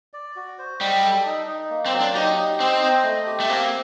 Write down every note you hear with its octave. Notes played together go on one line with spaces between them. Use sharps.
D5
F#4
C5
G3 D#5
A4
D#4
D#4
A#3
C4
F#3
D4
D#4 G4
D#4
C4 C5
D#5
A3
G4
A3
A#3 C4